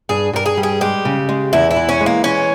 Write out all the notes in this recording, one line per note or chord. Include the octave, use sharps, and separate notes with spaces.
G2 G#4
G2 A#4
G#4
G3
G#4
G#3 G4
C#3
G#3
E2 E4
E4
E3
C#4
G#3
A#3
E3 C#4